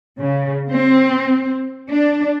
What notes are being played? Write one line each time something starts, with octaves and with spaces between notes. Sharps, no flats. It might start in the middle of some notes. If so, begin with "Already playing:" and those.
C#3
C4
D4